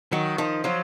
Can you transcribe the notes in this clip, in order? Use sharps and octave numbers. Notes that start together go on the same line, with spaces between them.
D#3 F#3 F#4
D#3 F3 D#4
F3 F#3 F4